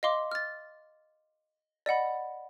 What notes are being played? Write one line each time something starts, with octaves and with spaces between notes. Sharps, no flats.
D#5 F5 C6 D6
F6 A6
D5 D#5 F#5 B5